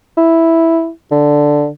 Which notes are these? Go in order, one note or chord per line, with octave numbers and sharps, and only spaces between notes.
E4
D3